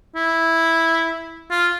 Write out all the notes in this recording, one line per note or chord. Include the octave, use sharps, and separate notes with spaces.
E4
F4